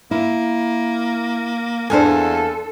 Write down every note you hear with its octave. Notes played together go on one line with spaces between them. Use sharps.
A#3 E4
E2 A#3 D4 A4 C5 F5 G#5